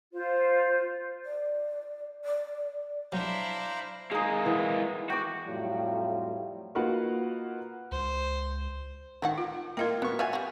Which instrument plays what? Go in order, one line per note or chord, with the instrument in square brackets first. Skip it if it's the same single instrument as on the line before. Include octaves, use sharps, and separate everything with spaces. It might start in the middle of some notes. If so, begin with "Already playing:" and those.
[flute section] F4 C5
[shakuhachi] D5
D5
[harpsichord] F#3 [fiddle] D4 E4 [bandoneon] C5 F5 A#5
[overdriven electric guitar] G#3 A#3 [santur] D#4 G#4
[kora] E3 B3
[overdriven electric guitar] F#4 [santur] G5 D6
[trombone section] F2 A2 F#3 G3 F4
[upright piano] A#3 D#4 F4 F#4 B4 F#5
[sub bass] C#2 [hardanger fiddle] C5
[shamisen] D3 F#4 F#5 [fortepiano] D#3
[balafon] F4
[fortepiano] A#3 F4 [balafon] A#4 D#5 G5
[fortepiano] B3 C#6 [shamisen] F#4
[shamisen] F#4 D5 F5 [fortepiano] E5 G#5
[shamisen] F#4 G4